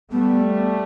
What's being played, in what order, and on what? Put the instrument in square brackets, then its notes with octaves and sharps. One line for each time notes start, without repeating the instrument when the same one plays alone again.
[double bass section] G3 A3 [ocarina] B3